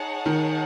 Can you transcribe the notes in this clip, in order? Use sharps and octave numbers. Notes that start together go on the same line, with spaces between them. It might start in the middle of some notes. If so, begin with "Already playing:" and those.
Already playing: D#4 G#4 C#5 F#5 A5
D#3